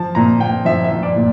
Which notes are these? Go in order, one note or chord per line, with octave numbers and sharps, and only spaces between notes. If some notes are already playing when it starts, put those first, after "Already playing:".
Already playing: F3 A5
A#2 A#5
A#2 G5
F3 E5
E5
F3
D5
A#2